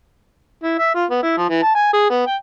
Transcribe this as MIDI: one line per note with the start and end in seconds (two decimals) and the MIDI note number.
0.63 0.74 64
0.78 0.92 76
0.95 1.05 65
1.10 1.20 59
1.23 1.35 64
1.38 1.46 53
1.49 1.59 52
1.63 1.71 81
1.75 1.89 80
1.93 2.08 68
2.10 2.23 59
2.27 2.36 79